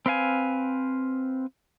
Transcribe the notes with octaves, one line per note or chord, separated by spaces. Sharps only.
C4 B4 F5 G#5